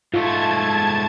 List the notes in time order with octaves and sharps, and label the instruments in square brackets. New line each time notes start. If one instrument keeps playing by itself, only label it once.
[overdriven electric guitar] G#2 A3 [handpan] F4 [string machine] A5 G#6